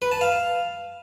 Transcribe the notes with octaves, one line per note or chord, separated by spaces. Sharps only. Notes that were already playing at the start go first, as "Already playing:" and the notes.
B4
A5
F5